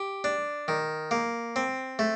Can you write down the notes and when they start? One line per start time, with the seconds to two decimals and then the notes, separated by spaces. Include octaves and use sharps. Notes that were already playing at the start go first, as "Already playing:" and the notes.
Already playing: G4
0.24 D4
0.68 D#3
1.11 A#3
1.56 C4
1.99 A3